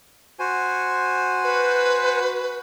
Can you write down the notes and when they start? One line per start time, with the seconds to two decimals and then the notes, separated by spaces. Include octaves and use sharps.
0.39 F#4 C5 G#5
1.44 B4